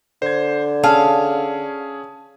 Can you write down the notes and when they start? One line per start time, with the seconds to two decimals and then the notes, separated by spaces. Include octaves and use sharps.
0.22 D3 C5 G#6
0.84 C#4 G#4 F5 A5 E6